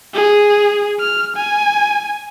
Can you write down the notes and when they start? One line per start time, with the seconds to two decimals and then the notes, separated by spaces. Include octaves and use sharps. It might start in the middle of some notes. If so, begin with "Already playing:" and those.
0.14 G#4
1.00 F6
1.36 G#5